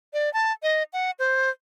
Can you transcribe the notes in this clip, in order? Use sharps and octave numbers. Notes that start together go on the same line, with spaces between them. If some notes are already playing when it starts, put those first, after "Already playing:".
D5
A5
D#5
F#5
C5